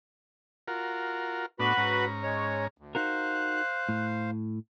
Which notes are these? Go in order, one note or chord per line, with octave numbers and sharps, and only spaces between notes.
F4 F#4 A#4
A2 B3 D4 F#4 B4 B5
G#2 C#4 A#5
G#3 C#5
D2
D#4 F#4 A#4 C5 F5 F#6
A2